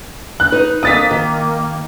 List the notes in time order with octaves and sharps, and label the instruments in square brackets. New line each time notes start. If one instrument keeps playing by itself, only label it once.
[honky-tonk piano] F#6
[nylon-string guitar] D#4 B4
[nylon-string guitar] F2 F5 [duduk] A#3 [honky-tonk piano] D#6 A6 B6
[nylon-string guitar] D#3